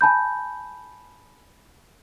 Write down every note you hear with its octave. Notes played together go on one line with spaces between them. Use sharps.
G#5 A5 B5 G6